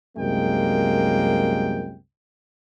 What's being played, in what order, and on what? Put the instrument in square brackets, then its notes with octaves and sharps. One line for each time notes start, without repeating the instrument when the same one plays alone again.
[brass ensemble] C2 F#2 G#3 A#3 G5